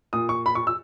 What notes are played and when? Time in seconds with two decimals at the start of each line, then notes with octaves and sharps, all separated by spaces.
0.13 A#2 D#6
0.29 C#6
0.46 B5
0.55 C#6
0.67 E6